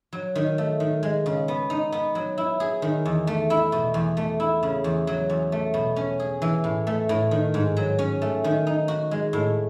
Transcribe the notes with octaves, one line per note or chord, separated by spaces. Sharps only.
F#3
D#3
A3
D#3
G#3
C#3
B3
D#4
B3
F#3
E4
G#4
D#3
E2
A3
E4
B2
E2
A3
E4
C#3
E2
F#3
E2
A3
B2
C#4
G#4
E3
A2
A3
A2
D#3
G#2
F#3
C#4
A3
D#3
D#4
F#4
G#3
A2